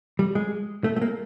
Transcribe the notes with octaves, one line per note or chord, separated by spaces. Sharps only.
G3
G#3
A3
A3
A#3